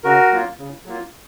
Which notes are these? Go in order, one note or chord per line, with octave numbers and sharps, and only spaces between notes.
C#3 F#4 A#4
F#3 A#3 F4
C#3
F#3 A#3 F4